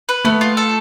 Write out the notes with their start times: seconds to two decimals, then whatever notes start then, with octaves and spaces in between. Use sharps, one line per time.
0.09 B4
0.25 A3 B3
0.41 F4
0.57 A4